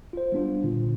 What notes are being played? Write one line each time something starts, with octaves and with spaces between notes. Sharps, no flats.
F4 C5
G3 B3 D4 F4
A#2 D3